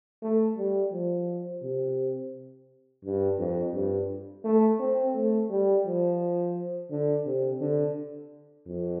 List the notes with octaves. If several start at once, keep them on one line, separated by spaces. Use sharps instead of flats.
A3
G3
F3
C3
G2
F2
G2
A3
C4
A3
G3
F3
D3
C3
D3
F2